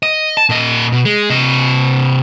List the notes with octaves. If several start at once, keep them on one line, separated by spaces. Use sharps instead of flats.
D#5
A5
A#2 D#5
B2
G#3
C3 D#5